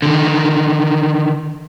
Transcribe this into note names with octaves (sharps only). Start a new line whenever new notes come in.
D3 D#3